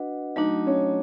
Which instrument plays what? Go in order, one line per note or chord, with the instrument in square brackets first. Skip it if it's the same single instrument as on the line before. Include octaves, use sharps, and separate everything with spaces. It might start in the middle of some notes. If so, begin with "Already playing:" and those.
Already playing: [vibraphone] D4 F#4 B4 D#5 F#5
[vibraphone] F#3 A3 D4 F#4 [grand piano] D#4
[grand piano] C#4